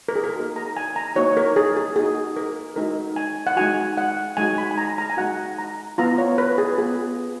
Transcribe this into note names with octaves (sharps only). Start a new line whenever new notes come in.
A#4
G#4
A#4
A#3 D#4 F#4
A#5
G#5
A#5
A#3 D#4 F#4 C#5
A#4
G#4
G#4
A#3 D#4 F#4 G#4
A#4
G#3 D#4 F#4 A#4
G#5
F#5
G#3 D#4 F#4 G#5
F#5
G#3 D#4 F#4 G#5
B5
G#5
A#5
A#5
G#5
G#3 D#4 F#4 F#5
A#5
B3 F4 A#5
C#5
B4
G#4
B3 F4 G#4